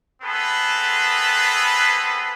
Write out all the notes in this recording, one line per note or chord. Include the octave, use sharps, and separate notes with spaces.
B3 C4 G#4 A4 B4